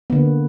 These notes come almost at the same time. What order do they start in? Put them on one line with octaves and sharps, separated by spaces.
B3 D3 A#3